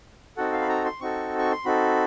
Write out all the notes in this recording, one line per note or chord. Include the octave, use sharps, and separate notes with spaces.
C4 D#4 F#4 A4 F#5
F5
B5
A#5
C6
C4 D#4 F#4 A4 C#6
C#6
C6
C4 D#4 F#4 A4 B5